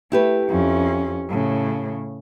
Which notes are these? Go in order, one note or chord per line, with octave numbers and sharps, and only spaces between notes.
A3 E4 G4 B4
F2 C#4
A2 C#3